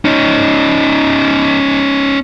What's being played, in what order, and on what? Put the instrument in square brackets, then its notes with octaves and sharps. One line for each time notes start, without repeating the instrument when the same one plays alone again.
[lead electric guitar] C#4 D#4